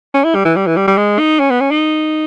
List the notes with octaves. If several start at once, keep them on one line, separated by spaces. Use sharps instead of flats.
C#4
E4
G3
E3
G3
E3
G3
G3
G#3
D#4
C#4
B3
C#4
D#4